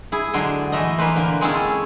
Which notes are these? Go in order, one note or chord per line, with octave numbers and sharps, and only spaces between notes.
E4 G#4
D3 F#3 G#3 D4 C5
E3 A3 D#5
E3 A#3 B4 C5
D3 A#3
G#3 C4 C#4 E4 G#4 A4